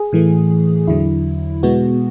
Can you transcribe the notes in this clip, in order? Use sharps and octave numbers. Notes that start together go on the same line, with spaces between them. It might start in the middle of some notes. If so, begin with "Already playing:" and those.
Already playing: G#4
A2 E3 A3
E2 D3 F#3 E4
B2 G#3 B3 F#4